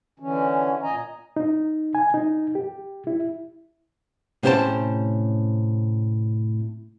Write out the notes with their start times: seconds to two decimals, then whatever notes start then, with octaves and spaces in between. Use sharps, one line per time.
0.19 D3 E3 C#4
0.83 A#2 D#5 G#5 A#5
1.36 D#4
1.95 G#5
2.14 D#4
2.55 G4
3.07 E4
4.43 A2 C3 C#4 C5 G5 A5